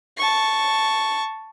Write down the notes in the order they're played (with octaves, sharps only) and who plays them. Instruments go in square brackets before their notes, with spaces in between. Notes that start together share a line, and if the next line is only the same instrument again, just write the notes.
[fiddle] A5 C#6